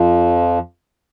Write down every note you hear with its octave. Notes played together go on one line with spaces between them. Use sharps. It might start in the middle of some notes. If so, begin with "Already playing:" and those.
Already playing: F2 F3